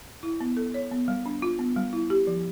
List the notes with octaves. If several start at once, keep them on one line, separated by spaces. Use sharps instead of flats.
E4
B3
A4
C#5
B3
G3
D4
F4
B3
G3
E4
G4
F3